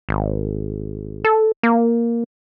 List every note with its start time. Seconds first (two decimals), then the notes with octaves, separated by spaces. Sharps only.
0.09 G#1
1.25 A4
1.63 A#3